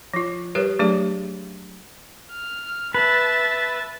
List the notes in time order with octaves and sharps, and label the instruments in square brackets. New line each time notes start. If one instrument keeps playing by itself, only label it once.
[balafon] F3 F4
G3 G4 A#4 B4 C#5
F#3 A3 D4 G4 G#4 D5
[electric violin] F6
[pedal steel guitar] B4 [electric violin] E5 A5